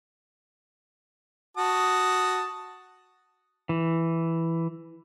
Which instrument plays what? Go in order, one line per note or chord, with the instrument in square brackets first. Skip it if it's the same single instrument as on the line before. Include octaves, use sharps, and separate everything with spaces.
[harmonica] F#4 A5 D#6
[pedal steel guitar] E3